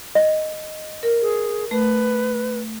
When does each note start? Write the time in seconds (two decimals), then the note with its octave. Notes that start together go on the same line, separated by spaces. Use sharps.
0.15 D#5
1.03 A#4
1.21 G#4
1.71 A3 B4